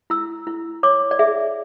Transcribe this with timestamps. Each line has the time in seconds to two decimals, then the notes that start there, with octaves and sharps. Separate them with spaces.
0.10 E4 E6
0.47 E4
0.83 C#5 D6
1.11 D5
1.19 G#4 E5